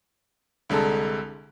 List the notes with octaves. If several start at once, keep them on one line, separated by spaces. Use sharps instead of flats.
C2 D3 G#3 A4 A#5